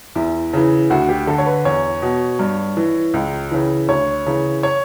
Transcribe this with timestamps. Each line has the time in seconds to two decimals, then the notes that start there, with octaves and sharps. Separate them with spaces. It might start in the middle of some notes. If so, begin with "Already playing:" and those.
0.15 E2 E4
0.53 C#3 E3
0.90 D2 F#4
1.09 G4
1.27 D3 A4
1.38 C#5
1.46 B4
1.65 E2 C#5
2.02 B2
2.39 G2
2.77 E3
3.14 C#2
3.51 C#3 E3
3.88 D2 C#5
4.26 C#3 E3
4.63 C#5